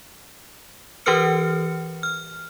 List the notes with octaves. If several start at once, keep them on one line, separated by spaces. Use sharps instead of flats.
E3 G4 A#4 B4 F6 C#7
F6